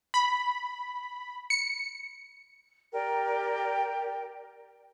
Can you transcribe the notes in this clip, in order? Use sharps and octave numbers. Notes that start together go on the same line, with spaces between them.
B5
C#7
G4 A#4 D5 G5